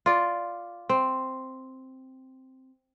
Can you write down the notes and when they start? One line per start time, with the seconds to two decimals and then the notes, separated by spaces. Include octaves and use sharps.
0.06 F4 D5
0.89 C4